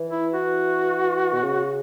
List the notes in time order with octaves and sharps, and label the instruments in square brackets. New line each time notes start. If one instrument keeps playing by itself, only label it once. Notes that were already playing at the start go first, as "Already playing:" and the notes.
Already playing: [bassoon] E3
[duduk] E4
F#4
[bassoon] B2
C#3